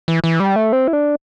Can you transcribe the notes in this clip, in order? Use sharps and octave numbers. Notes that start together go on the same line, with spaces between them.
E3
E3
G3
A3
C4
E4
D4